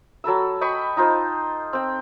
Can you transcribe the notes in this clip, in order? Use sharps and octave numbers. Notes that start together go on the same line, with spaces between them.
F#3 A4 B5 E6
D#5 G5 B5 C#6
D#4 F4 C5
C4 G5